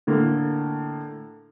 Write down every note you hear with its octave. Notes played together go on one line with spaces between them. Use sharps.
A2 D3 A#3